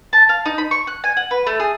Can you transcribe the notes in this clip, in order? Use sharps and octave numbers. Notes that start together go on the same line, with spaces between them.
A5
F5
D#4
B5
C#6
F#6
G#5
F#5
B4
A3
G#4